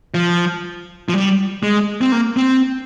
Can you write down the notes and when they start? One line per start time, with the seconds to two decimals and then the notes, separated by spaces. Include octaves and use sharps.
0.14 F3
1.09 F3
1.14 G3
1.63 G#3
2.01 C4
2.12 A#3
2.37 C4